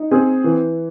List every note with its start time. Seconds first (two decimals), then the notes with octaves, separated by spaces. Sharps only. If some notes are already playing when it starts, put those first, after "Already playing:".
Already playing: D#4
0.11 C4 G#4
0.44 E3